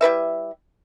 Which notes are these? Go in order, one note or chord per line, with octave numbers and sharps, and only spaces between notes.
G3 E4 B4 E5